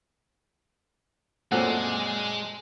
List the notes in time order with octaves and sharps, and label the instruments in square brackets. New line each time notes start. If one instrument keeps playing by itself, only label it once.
[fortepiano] F#2 C4 A4 [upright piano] A#2 [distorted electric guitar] G#3 [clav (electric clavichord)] F#5